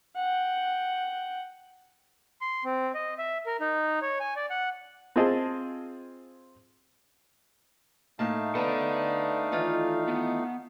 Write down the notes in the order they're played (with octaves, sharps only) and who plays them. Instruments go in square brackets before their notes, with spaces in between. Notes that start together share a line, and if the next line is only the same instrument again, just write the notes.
[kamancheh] F#5 G5
[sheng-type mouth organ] C6
C4
D#5
E5
A#4
D#4
C#5
G#5
D5
F#5
[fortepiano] C4 F4 G#4 D#5 A5
[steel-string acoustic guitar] A2 A#3 A5 [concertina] A3 D#4 F5
[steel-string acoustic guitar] B3 [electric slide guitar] A4 D5 A5
[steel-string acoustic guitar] D#3 E3 F4
[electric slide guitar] B3